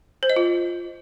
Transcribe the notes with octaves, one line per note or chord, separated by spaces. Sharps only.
C5
D#5
F4